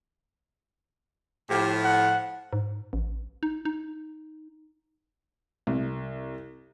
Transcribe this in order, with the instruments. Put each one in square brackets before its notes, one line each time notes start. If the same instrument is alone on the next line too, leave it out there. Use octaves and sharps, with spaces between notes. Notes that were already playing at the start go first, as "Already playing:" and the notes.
[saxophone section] A2 F3 [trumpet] G4
[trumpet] F#5
[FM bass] G#2
A1
D#4
D#4
[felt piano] C2